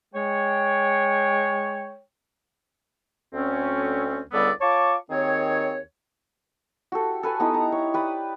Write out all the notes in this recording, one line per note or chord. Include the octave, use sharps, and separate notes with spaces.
G#3 C#5 G5
D2 C4 C#4
C#2 D3 G3 B3 D5 E6
F4 C#5 A5 C#6 D6
D#2 D#3 C4 G#4 C#5
F#4 G4 A4
A4 B4 G#5 A5
B3 D#4 E4 G4
A#5
C#5
G4 B4 D5 D#6